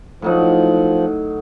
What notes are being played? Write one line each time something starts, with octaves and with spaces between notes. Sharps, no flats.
A2 F3 F#3 D#4